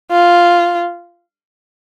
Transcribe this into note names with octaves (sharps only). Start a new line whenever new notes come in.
F4